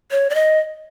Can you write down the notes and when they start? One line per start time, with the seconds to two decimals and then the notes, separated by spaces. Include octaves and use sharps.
0.11 C#5
0.30 D5
0.35 D#5